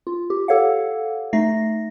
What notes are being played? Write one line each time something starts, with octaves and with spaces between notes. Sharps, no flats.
F4
G4
G4 A4 C#5 F5 F#5
A3 D#4 A#6 C7